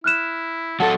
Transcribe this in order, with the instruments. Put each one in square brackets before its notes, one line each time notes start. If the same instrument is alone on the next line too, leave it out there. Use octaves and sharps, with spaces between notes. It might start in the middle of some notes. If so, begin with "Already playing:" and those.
[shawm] E4 [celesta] F6 F#6 E7
[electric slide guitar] F#3 A4 [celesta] F#5 [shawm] A5